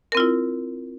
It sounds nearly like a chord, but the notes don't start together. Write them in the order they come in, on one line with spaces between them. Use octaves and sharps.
A#4 C4 F4 E4